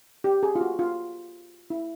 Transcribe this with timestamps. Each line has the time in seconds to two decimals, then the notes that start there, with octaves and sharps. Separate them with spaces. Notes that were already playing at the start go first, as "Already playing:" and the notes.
0.24 G4
0.43 G#4
0.55 F4
0.61 F#4
0.79 F4
1.70 E4